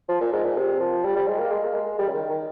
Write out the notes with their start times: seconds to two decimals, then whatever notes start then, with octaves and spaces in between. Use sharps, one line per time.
0.09 F3
0.21 A#2
0.32 G#2
0.44 A#2
0.57 C3
0.80 F3
1.04 G3
1.16 G3
1.27 G#3
1.39 A#3
1.51 G#3
1.64 A#3
1.75 G#3
1.99 G3
2.08 C#3
2.14 D#3
2.30 D#3